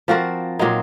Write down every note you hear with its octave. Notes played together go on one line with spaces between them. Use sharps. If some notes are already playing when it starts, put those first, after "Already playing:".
F3 C4 F#4 A#4
A#2 F#3 C4 D#4